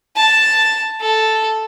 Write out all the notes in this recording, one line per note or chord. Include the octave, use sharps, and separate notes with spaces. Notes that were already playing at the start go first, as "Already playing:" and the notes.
A5
A4